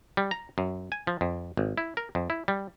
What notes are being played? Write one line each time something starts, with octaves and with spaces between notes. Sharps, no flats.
G3
A#5
F#2
G#5
F3
F2
G#1
E4
A#4
F2
E4
G3